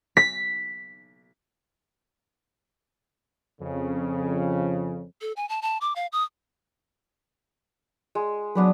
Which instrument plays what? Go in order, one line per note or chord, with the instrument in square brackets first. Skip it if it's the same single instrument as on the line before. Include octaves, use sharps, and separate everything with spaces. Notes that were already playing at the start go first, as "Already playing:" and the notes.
[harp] B6
[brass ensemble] F2 C#3
[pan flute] A4
G#5
A5
A5
D6
F5
D#6
[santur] G#3
[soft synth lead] F#3 [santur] B3 D4 B4